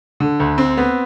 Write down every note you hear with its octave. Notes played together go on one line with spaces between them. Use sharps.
D3
D2
C4
B3